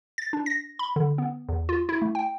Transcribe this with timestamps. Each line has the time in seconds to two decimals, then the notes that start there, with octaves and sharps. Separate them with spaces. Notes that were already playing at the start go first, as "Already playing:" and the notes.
0.18 A6
0.33 D4
0.46 A#6
0.79 B5
0.96 D3
1.18 B3
1.48 E2
1.69 F4
1.89 E4
2.02 A3
2.15 G5